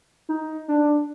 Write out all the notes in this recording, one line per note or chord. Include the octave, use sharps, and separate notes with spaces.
D#4
D4